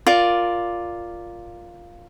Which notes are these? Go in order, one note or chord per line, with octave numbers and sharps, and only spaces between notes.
F4 A#4 D5